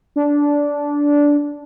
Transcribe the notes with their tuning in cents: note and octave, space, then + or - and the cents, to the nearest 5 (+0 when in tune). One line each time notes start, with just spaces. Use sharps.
D4 -15